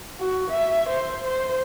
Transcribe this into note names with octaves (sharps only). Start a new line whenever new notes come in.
F#4
E5
C5
C5